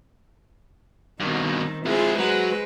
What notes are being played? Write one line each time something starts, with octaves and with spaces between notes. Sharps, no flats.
G2 B2 D#3 C4
G#3 C4 E4 F4 G#4
F#3 G#3 B4 C5